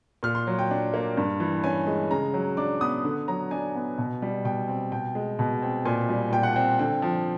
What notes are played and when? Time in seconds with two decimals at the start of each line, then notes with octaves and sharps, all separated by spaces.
0.23 A#2 F6
0.35 C6
0.47 F#3
0.59 G5
0.71 D4
0.94 A#3
1.17 G2
1.40 E3
1.64 C#4 G#5
1.87 G#3
2.11 C#3 A#5
2.34 F#3
2.57 D4 D6
2.81 B3 D#6
3.04 D3
3.28 F#3 A#5
3.51 D4 G#5
3.75 B3
3.98 B2
4.22 G3
4.45 B2 G5
4.68 C4
4.91 B2 G5
5.15 G#3
5.39 B2
5.62 C4
5.86 A#2 G#5
6.09 G3 G#5
6.32 A#2 G5
6.43 F#5
6.53 G5
6.56 C4
6.79 D3 G5
7.02 F3